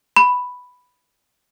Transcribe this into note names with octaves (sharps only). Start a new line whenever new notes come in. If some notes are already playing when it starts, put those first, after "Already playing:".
B5